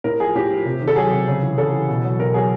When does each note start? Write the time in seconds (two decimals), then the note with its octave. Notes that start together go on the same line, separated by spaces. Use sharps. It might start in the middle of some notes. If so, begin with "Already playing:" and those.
0.04 A2 A#4
0.20 F3 G#4
0.35 A2 G4
0.51 F3
0.65 C3
0.81 D#3
0.87 A4
0.96 F#3 G#4
1.11 C3
1.28 C#3
1.43 E3
1.58 C#3 A4
1.72 E3
1.88 B2
2.04 F#3
2.20 B2 A#4
2.34 F#3 G#4